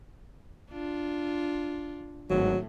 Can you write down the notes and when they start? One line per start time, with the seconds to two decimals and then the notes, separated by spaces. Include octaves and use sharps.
0.71 D4 F4
2.30 G#1 A2 F#3